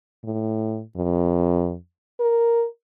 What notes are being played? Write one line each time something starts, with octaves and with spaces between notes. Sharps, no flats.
A2
F2
A#4